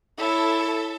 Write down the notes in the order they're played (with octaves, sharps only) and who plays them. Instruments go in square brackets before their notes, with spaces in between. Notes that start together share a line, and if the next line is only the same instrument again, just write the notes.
[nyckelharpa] E4 C#5 [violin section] A4 E5